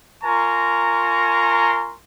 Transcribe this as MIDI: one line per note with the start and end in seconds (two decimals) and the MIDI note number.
0.24 1.95 65
0.24 1.95 70
0.24 1.95 80
0.24 1.95 82
0.24 1.95 84
0.24 1.95 85